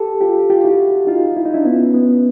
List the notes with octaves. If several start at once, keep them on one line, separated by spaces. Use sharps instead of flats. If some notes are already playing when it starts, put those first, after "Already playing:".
Already playing: G4 A4
F4 G4
F4 G4
E4 F#4
D#4 F4
E4
D#4
D4 E4
B3 C#4
B3